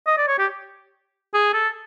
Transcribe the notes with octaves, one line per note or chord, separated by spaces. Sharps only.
D#5
D5
C#5
G4
G#4
A4